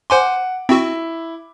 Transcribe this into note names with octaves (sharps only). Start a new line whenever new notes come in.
C5 F#5 G#5 C6 D6
C4 E4 F#4